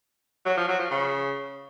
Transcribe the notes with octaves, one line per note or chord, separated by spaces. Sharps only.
F#3
F3
F#3
F3
C#3